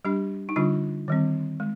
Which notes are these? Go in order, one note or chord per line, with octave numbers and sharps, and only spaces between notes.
G3 D4 G4
D#4
D3 G3 D4 F4
D#3 G3 C4
G#3